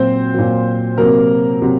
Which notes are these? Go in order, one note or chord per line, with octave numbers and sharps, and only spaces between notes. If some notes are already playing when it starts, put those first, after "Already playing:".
Already playing: A#2 F#3 C4 C5
A#2 F#3
C3 F#3 A#3 A#4
C3 F#3